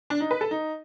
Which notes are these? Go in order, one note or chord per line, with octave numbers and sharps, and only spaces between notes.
D4
D#4
B4
A4
D#4